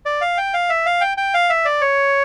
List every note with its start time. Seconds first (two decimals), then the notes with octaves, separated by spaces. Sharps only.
0.06 D5
0.21 F5
0.38 G5
0.54 F5
0.70 E5
0.86 F5
1.01 G5
1.17 G5
1.34 F5
1.50 E5
1.65 D5
1.81 C#5